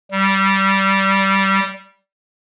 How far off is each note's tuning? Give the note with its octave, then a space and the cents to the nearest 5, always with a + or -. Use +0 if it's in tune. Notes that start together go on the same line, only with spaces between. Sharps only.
G3 -15